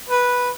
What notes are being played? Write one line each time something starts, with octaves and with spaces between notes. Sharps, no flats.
B4